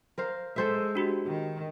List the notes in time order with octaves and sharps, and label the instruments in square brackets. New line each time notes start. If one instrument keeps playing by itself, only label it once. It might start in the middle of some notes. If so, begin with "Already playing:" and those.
[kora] A#4 C5 F5
[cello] G#3 [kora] A4 C5 E5
[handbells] D4 F#4 G4
[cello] D#3